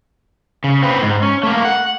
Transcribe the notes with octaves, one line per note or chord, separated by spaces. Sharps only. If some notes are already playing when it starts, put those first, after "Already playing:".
C#3
C4 B4
G#2
C#4
A3 A#3
F#5